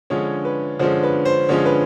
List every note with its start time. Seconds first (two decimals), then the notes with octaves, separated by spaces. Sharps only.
0.10 D3 F3 G#3 C#4 C#5
0.45 B4
0.79 D3 F3 G#3 C#4 C5
1.03 B4
1.25 C5
1.49 D3 F3 G#3 C#4 C#5
1.66 B4